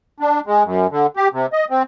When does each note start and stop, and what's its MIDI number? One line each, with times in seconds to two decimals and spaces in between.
0.20 0.40 62
0.46 0.63 56
0.64 0.87 42
0.91 1.06 50
1.17 1.28 67
1.33 1.46 48
1.53 1.65 75
1.70 1.83 60